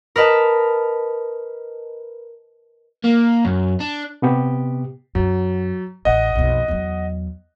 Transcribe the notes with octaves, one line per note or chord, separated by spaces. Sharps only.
A#4 B4 D#5 A5
A#3
F#2
D4
C3 B3 G4
F#2 F#3
A1 D#5 F#5
B1 F2
E2 F#3